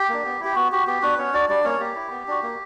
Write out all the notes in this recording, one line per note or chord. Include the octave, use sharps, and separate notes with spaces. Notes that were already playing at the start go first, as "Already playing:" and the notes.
Already playing: G4
A#3 D4
B3
E4 G4
B3 F#4
F#4 G4
B3 G4
B3 D4 F#4 B4
B3 C#4 C#5
D4 F#4 D5
G3 D4 D5
A#3 C#4 C#5
A#3 G4
E4
B3
D4 F#4
A#3